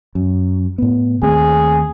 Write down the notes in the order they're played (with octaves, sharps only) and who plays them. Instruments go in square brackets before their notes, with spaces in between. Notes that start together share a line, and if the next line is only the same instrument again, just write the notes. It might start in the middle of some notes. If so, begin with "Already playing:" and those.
[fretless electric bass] F#2
A2 B3
[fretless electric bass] D#2 A3 C4 [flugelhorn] G#4